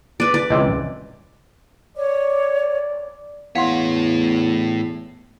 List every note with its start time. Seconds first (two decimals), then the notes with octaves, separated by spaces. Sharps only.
0.20 B4 D5
0.34 D5
0.51 C#2 C3 E3
1.97 C#5 D5
3.56 E2 A2 C#5 F5 F#5 C6